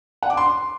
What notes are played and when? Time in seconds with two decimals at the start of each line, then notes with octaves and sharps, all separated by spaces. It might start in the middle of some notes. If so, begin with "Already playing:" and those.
0.23 F#5
0.30 D6
0.37 C6